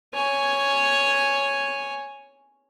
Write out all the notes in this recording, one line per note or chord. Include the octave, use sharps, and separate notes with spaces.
C#5 G#5